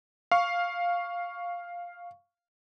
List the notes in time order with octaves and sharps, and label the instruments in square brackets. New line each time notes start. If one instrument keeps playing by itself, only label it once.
[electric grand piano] F5 C#6